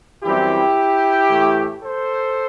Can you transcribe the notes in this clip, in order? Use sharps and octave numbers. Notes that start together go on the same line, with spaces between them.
F#2 E3 G3 C4 E4 G4
A2 E3 A3
A4 C5